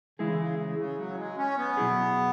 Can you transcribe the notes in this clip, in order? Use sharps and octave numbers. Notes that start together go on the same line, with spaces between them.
C#3 E3 G#3 E4 G#4
C#3
C#3
C#3
F#3
G#3
C#4
B3
B2 F#3 E4 G#4